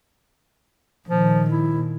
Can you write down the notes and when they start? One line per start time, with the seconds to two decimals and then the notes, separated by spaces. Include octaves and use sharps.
1.08 A#2 D#3 F3
1.50 E4